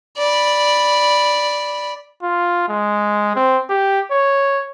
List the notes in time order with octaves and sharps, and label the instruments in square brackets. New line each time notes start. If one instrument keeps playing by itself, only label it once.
[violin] D5 B5
[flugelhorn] F4
G#3
C4
G4
C#5